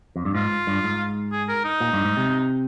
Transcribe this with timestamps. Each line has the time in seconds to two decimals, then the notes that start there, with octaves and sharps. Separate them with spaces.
0.16 F2
0.25 G2
0.35 G#2 F4
0.67 G2
0.84 G#2
1.32 G#4
1.49 A#4
1.65 D#4
1.81 A#2
1.93 G2
2.05 G#2
2.17 C3